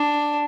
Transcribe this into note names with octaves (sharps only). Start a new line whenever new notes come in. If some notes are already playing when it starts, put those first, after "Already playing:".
Already playing: D4